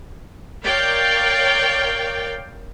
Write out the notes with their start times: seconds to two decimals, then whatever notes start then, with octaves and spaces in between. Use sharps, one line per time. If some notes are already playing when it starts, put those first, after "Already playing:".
0.64 A#4 C#5 D5 F5 G5